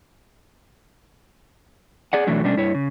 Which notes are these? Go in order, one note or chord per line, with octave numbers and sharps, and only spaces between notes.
G#4 D5 F#5
F#2 B2 E3 F#3 A3 D4
B2 G3 A3 C#4 D4
G2 E4 C#5
C#3